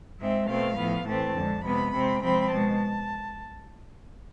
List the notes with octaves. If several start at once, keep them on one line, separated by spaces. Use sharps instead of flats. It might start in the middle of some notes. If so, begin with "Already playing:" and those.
G#2 G#3 C4 E5
B2 A3 C4 F5
A2 F3 B3
A2 E3 A3 C4 A5
F2 D3 G#3
C3 G#3 B3 B5
C3 G#3 C4
C3 F3 G#3 C4 B5
B2 G#3 A5